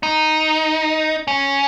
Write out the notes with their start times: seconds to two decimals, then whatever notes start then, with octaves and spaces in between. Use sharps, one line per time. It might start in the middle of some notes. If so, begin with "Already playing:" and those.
0.03 D#4
1.28 C#4